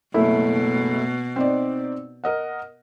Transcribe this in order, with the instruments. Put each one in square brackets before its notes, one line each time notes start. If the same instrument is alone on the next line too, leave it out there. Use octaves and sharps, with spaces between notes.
[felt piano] F#1 A3 E4 [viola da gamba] B2
[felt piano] C4 D#4 D5
A#4 D#5 F#5